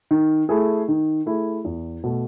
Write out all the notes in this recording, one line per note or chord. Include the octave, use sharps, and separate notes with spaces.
D#3
A3 E4 G#4
D#3
A3 E4 G#4
E2
B2 A3